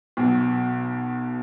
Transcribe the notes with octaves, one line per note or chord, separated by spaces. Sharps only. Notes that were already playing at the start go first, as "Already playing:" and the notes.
B1 B2 F#3